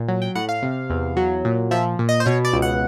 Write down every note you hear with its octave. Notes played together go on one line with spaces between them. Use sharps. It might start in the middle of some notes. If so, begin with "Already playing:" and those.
Already playing: A#2
F#3
G5
A2 F#5
F5
C3
E2
F#3
A#2
F3 E5
A#2
D#5
C5
B2 C#5
D5
C#2
F#5